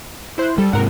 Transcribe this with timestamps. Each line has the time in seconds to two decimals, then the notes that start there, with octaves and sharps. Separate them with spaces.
0.38 E4 C5 F#6
0.58 G3 A4
0.73 G#2 C3 A#4 F#5